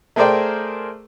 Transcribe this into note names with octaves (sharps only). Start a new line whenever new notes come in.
A3 G#4 A#4 C5 D5 G5